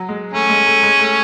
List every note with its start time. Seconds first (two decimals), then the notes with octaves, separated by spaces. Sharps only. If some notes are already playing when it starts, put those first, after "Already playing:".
Already playing: F#3
0.09 G#3
0.33 A3 C#4
0.49 G#3
0.67 A3
0.83 G#3
0.99 A3